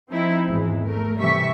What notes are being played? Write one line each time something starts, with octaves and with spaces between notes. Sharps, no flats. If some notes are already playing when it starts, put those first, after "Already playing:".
F3 C4 D#4 E4
G#1 E2 E3 G#3
A3 A#4
C3 E3 G3 E5 C#6 B6